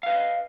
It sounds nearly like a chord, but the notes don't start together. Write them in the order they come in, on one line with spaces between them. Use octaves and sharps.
F5 B4 D#5